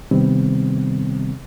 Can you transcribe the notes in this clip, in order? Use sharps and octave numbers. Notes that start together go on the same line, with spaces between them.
C3 D#3 G3 B3 C4